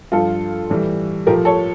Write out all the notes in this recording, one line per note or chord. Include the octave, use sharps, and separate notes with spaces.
G2 F3 F4 A4
A2 E3 G3
A2 F3 G4 A#4
A4 C#5